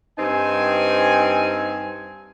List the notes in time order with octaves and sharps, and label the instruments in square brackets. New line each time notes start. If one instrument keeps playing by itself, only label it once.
[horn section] G2 C4 D#4 G#5